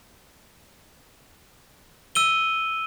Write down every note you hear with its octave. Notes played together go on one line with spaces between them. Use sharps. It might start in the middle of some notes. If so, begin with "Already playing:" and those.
E6 D#7 G7